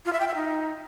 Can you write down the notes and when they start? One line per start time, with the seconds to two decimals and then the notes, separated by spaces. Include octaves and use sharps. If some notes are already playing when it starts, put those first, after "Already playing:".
0.05 F4
0.12 E5
0.20 G5
0.27 E5
0.35 D#4